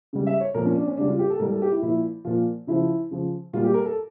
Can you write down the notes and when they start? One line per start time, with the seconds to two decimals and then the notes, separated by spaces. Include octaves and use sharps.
0.13 C#3 G3
0.27 E5
0.40 C#5
0.54 A#2 F3 A#4
0.66 C#4
0.76 D4
0.87 C#4
0.97 C#3 G3 D4
1.09 F4
1.19 G4
1.30 A4
1.39 A2 G3 A#4
1.51 A4
1.62 G4
1.71 E4
1.82 A#2 F3 E4
2.25 A#2 F3 F4
2.67 C#3 F3 E4
3.11 C#3 F3
3.53 A#2 G3 F4
3.64 G4
3.74 A#4
3.86 A4